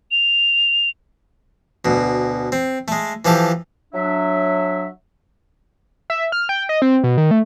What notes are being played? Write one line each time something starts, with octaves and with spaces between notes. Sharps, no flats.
F7
D2 B2
C4
G#3 A3
E3 F3 G4 A4
F#3 D4 E5
E5
F6
G5
D#5
C4
B2
D#3
A3